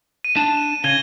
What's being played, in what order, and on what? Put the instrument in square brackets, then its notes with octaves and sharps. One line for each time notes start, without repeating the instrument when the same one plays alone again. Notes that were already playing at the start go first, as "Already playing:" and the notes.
[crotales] D#7
[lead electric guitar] D4 A5
[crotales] E7
[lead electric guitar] C#3 [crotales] G#6 D#7 G7